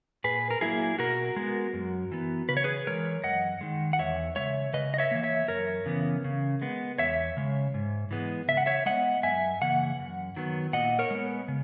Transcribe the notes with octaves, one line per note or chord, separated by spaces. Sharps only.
A#2 G#4 B4
A#4
F#3 A#3 E4 G#4
B2 F#4 A#4
G#3 B3
F#2
E3 B3
C#3 B4
C#5
G#4 B4
E3 G#3 A#4 C#5
F#2 D#5 F#5
D#3 G#3
F#5
E2 C#5 E5
C#3 G#3 C#5 E5
C#3 B4 D#5
D#5
C#5 E5
E3 A#3
C#5 E5
F#2 A#4 C#5
C#3 E3 B3
C#3
G#3 B3
E2 C#5 E5
C#3 G#3
G#2
E3 G#3 B3
C#3 E5
F#5
C#5 E5
G#3 B3 D#5 F#5
F#2 E5 G#5
C#3 E3 A#3 F#5
F#2
D#3 F#3 B3
A#2 D#5 F#5
A#4 C#5
G#3 B3
C#3